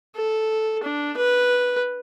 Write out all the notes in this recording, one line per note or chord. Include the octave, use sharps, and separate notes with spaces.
A4
D4
B4